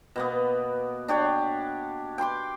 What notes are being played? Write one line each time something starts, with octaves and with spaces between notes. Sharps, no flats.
B2 A#3 B3
D4 G4 C#5 F#5
G5 B5 C6 D6